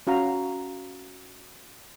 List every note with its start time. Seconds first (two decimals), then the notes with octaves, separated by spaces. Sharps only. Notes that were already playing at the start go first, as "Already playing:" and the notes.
0.07 C#4 F#4 F5 A#5